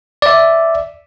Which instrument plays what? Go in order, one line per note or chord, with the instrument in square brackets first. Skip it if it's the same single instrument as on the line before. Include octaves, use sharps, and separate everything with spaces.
[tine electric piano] D5 E5